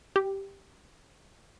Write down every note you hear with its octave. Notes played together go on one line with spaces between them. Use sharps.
G4